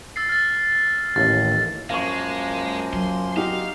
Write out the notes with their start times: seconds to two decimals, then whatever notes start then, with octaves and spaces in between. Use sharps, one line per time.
0.16 E6 A6 C7
0.29 F6 A6
1.16 A1 D#2 A6
1.90 F#2 F3 G#3 A#3 F5 C#6
2.93 F#3 C6
3.37 D#4 F#4 G4 F5